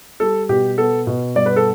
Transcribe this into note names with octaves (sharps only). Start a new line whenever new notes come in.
G3 A4
B2 G4
B3 A4
B2
G2 D5
B4
A4